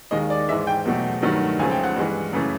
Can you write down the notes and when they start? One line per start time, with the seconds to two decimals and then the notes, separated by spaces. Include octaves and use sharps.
0.11 D#2 D#3 G#3 D#5
0.30 D5
0.48 G#2 E3 G#3 E5
0.67 G5
0.85 E2 B2 F#3 A3
1.22 G2 D#3 F#3 A3
1.59 C#2 C#3 F3 A3 G#5
1.71 G5
1.84 F#5
1.96 G2 E3 G#3
2.33 F#2 C#3 E3 A3